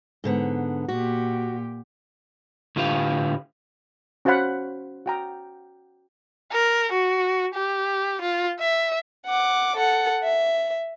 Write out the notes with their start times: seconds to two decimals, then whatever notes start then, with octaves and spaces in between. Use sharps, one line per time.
0.24 G#2 D3 B3
0.88 A#2 F#4 G4
2.76 A2 D3 F4 G4 B4 F5
4.25 C#4 F#4 C5 F5 F#5 B5
5.06 F#4 G5 A#5
6.52 A#4
6.92 F#4
7.54 G4
8.21 F4
8.60 E5
9.26 F#5 D6
9.76 A4 F#5
10.23 E5